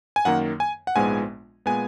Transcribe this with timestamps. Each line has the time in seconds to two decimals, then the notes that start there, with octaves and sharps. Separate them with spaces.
0.16 G#5
0.25 F#2 D#3 A#3 F#5
0.60 G#5
0.87 F#5
0.96 A#1 G#2 F3 G#3 B3 G#5
1.66 A#2 G#3 B3 G#5